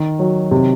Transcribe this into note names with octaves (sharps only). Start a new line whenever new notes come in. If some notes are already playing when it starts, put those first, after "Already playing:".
Already playing: D#3
F#3
C3